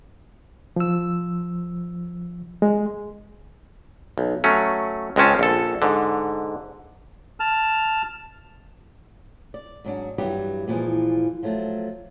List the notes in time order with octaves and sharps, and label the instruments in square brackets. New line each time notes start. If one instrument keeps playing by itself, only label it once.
[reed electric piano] F3 E6
G#3
[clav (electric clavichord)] B1
F#3 A3 C#4
C#2 G#3 C4 C#4 A5
A#1 A4
G#2 D3
[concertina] A5 F6
[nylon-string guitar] D5
G#2 F#3 D4
G2 E3 F#3 G3 G4 B4
A#2 E3 F3 G#3
F3 F#3 A3